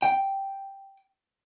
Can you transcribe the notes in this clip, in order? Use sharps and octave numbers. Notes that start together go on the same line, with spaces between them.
G5